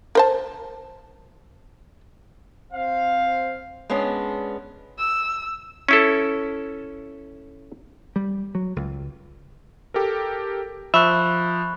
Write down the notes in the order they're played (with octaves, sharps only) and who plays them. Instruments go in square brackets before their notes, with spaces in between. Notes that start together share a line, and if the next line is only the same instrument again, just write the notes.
[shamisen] A#4 C5 A5
[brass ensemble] C4 C5 F5
[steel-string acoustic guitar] G#3 B3 C#4 D4
[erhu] E6
[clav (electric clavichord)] C#4 E4 A4
[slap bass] G3
F#3
C#2
[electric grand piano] G4 A4 A#4
[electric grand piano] F3 [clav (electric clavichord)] E5 [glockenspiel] B5 C#6 F#6